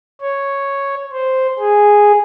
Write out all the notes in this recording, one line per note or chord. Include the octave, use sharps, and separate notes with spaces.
C#5
C5
G#4